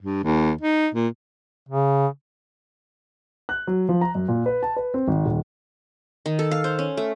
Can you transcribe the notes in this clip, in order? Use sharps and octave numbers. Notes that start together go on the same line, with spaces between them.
G2
D#2
D#4
A#2
C#3
F#6
F#3
F3
A#5
F#2
A#2
B4
A5
B4
C4
G#1
D#1
D#3
A4
F5
C5
C#4
A3